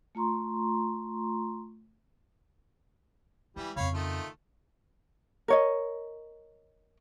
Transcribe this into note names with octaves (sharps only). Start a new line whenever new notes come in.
A3 F4 A#5 C6 C#6
E3 G3 G#3
F2 C#3 C#5 F5 B5
D#3 A3 F4
A#4 C#5 D#5